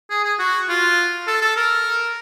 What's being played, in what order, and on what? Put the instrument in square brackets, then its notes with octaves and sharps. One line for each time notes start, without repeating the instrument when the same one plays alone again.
[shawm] G#4
G#4
F#4
F4
A4
A4
A#4